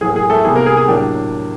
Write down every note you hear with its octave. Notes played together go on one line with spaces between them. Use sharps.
A2 F#3 A#3 G#4
G#4
A3 A4
C3 D#3 G3 B3 G#4
A#3 A#4
G#4
G#4
A2 F#3 A#3 D4 G4